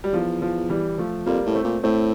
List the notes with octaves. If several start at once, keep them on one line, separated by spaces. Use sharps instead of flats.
G3
E2 F3
F3
E3 G3
F3 A3
F2 G3 A#3
A2
A3 C4
A#2
A2 A3 C4